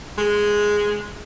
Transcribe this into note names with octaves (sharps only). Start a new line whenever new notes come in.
G#3